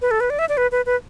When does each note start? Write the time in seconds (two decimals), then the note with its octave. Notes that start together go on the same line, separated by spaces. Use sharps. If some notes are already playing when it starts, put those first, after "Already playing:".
0.02 B4
0.11 A4
0.20 B4
0.30 D5
0.39 E5
0.49 D5
0.57 B4
0.72 B4
0.86 B4